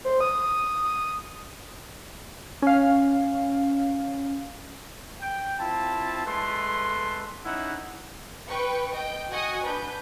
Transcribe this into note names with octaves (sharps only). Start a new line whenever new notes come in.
C5
D#6
C#4 F5
G5
C4 E4 F4 A5
G#3 A3 A4 B4 C6
C#4 D#4 E4 F#5
B4 G5 C#6
D#5 G5
F#4 D#5 F#5 G#5 C#6 D#6
D4 B4 G6